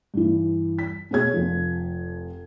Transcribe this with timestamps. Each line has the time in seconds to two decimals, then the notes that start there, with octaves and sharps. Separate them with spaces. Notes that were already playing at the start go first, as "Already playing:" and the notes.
0.14 G2 E3
0.79 B6
1.11 B2 A3 G#4 C#5 G#6
1.33 F1 F3